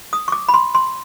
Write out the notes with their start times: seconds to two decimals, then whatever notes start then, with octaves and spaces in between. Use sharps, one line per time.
0.13 D#6
0.28 C#6
0.32 D6
0.48 B5
0.54 C6
0.75 C6